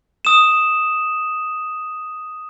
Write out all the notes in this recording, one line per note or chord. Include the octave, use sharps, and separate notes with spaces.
D#6 E7